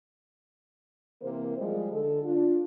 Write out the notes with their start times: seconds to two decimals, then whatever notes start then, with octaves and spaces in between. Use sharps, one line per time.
1.21 C3 E3 A#3 A#4 C5
1.57 F3 G3 G#3
1.91 D3 A4
2.23 D4 F4